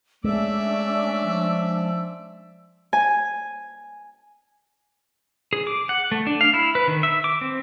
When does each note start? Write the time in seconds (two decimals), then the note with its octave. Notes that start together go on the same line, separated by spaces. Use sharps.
0.24 G#3 A3 C#4 D4 D5 E5 E6
1.23 F3
2.93 G#5
5.53 G#4
5.67 D6
5.89 F#5
6.12 A3
6.27 D4
6.41 F5
6.54 E4
6.75 B4
6.88 D#3
7.03 E5
7.24 D6
7.41 C4